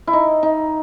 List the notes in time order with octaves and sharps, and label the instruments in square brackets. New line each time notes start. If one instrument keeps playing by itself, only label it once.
[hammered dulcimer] E4
D#4
D#4